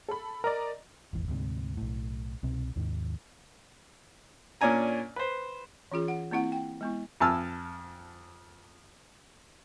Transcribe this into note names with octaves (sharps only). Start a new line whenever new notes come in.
A4 B5
A#4 D5 D#5 A#5
D#1 G#1 E2
D2 G#2 C3
B1 A2
C2 B2 C4
D#2 G#2 D#3
A#2 C#4 D4 G#5 A#5
B4 C5
E3 C#4 F4 G#4
F#5
A#3 C4 E4 F#5
G5
G#3 B3 E4
F2 G#5 A5 E6 F6